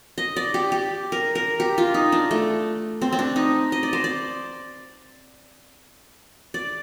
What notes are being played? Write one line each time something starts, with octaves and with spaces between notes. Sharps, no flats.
D#5
D5
G4
G4
A#4
A#4
G4
F4
D#4
D4
A3
C4
C4
D4
D#4
D#5
D5
C5
D5
D5